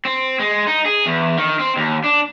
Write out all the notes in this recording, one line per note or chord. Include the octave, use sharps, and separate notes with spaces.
C4
G#3
D#4
G#4
E2
D#3
C4
D#2
D4